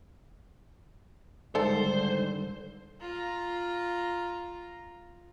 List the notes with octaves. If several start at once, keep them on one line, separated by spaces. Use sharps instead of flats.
G#2 D3 D#3 G3 A4 C5 D5 A5
F4 A#5